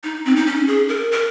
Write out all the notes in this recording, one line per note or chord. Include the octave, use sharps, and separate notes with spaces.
D#4
C4
D#4
C#4
G#4
A#4
A#4